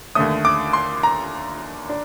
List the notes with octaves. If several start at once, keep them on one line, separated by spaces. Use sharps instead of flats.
D#2 D3 A3 D#6
D6
C6
A#5
D4